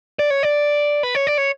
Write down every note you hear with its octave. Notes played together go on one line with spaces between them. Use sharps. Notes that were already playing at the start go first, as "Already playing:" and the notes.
D5
C#5
D5
B4
C#5
D5
C#5